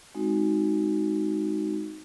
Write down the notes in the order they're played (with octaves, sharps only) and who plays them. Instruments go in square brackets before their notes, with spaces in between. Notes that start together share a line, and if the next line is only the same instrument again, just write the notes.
[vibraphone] G#3 C4 D#4 F#4